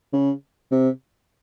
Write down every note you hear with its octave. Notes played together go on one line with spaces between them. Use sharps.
C#3
C3